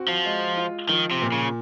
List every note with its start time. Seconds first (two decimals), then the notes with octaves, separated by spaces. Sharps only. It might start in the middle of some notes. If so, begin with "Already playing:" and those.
Already playing: C4 F#4
0.08 F3
0.24 G#3
0.57 F4
0.89 D#3 F3
1.11 C3
1.22 A#2
1.32 C#3